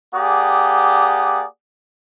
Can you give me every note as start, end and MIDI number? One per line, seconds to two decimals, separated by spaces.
0.15 1.44 58
0.15 1.44 67
0.15 1.44 68
0.15 1.44 74
0.15 1.44 78
0.15 1.44 87